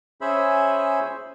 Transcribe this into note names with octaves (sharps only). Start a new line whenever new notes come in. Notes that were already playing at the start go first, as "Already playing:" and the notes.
C#4 G#4 C5 E5 B5